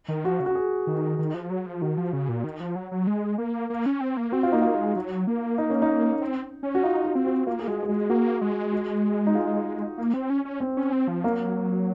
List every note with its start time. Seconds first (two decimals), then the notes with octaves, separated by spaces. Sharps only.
0.08 D#3
0.24 F3 F#4
0.40 C#3
0.46 F#4
0.55 G#4
0.87 D#3
1.19 D#3
1.34 F3
1.50 F#3
1.66 F3
1.82 D#3 F#4
1.97 F3
2.13 C#3
2.29 A#2
2.44 D#3
2.60 F3
2.76 F#3
2.92 F#3
3.07 G#3
3.38 A#3
3.70 A#3
3.86 C#4
4.01 C4
4.17 A#3
4.32 C4 F#4
4.43 F4
4.52 A#3 D#4
4.62 F4
4.75 G#3
4.96 F#3
5.27 A#3
5.58 D#4
5.70 C#4
5.82 D#4
6.22 C4
6.63 C#4
6.75 F#4
6.83 D#4 F4
7.05 F#4
7.15 C4
7.26 F#4
7.47 A#3 F4
7.59 G#4
7.68 G#3 F#4
7.83 G#4
7.89 G#3 F#4
8.10 A#3 F#4
8.41 G#3
8.73 F#4
9.27 D#4
9.35 F4
9.98 A#3
10.13 C4
10.30 C#4
10.45 C#4
10.60 C4
10.77 C#4
10.92 C4
11.08 F3
11.24 F#3 A#3